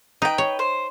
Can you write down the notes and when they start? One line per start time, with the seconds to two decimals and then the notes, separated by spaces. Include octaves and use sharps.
0.22 D#4 B4 G5
0.38 C#5
0.59 C5